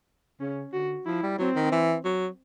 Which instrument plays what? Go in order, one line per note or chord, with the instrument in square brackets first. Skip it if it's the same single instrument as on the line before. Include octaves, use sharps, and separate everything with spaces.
[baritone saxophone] C#3 [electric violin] C#4
[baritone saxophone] D3 [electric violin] F#4
[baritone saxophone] F3 [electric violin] E4
[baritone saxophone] G3
[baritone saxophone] F#3 [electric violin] C4
[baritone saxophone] D#3
E3
F#3